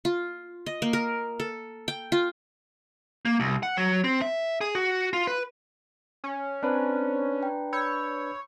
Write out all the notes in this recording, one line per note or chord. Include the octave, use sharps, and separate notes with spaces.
F4
D#5
A#3
A#4
A4
G5
F4
A#3
C2
F#5
F#3
C4
E5
G#4
F#4
F4
B4
C#4
C4 D4 B4 C5 A#5
G5 A#5
C#5 B5 E6 G6